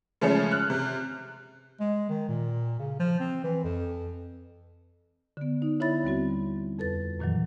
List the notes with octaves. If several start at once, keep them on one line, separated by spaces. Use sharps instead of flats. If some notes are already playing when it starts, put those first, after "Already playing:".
C#3 F3 G#3 A3 C#4
F6 F#6
C3
G#3
D#3
A#2
C#3
F3
C4
E3
F2
D3 B3
D#4
D3 E4 C#5 E5 B5 A6
D#2 G3 C4 F#4
F2 A4 B4 A6
F#2 A#2 D#3 E3 F#3